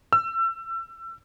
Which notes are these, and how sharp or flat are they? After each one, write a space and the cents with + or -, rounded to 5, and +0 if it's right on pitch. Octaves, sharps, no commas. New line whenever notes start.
E6 +30